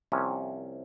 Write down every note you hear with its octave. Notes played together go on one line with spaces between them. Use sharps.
C2 C3 F3 A#3 C#4